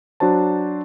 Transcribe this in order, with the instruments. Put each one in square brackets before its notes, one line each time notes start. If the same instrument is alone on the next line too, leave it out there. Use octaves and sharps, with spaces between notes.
[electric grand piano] F#3 D4 F#4 C5 A5